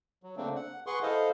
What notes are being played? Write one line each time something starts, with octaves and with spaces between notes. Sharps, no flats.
F#3
C#3 A3 A#3 C4 D4
F#5
G#4 B4 F#5 C6 C#6
E4 A4 C5 D#5 F5